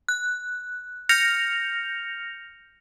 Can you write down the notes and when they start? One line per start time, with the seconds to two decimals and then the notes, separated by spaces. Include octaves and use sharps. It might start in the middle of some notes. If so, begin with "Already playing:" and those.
0.09 F#6
1.09 F6 G6 A#6 C#7 F7